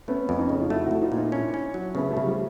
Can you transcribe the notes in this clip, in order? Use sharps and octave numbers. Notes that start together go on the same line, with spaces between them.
A3 B3 C#4
F2
C#4 D#4
C#3
F4
A3 E4 F#4
A3 E4 F#4
D#4 F4
A#2
D#4 F4
C#4 D4 E4
C#4
F#3
C#3 A3 B3
G3 A3
C#3
F3 G3